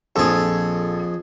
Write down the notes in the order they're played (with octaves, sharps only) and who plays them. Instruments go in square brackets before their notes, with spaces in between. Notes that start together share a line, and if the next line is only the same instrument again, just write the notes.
[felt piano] A#1 A4 [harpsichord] F2 G#4